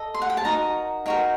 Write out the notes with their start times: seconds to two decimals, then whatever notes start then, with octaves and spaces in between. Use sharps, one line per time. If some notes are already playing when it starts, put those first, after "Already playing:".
Already playing: A4 D#5
0.14 C6
0.22 F#5
0.30 G5
0.37 A5
0.45 D#4 F#4 A#4 A#5
1.06 D#4 F#4 A#4 G5